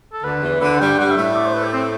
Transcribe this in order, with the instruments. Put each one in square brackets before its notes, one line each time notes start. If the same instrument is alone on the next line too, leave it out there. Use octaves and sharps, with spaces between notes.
[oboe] A4
[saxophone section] D2 D3 [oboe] B4
[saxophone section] E2 E3
[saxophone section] D2 D3 [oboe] B4
[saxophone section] G2 G3 [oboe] G5
[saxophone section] G2 G3 [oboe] F#5
[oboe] E5
[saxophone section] A2 A3
[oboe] E5
D5
C5
B4
G4
C4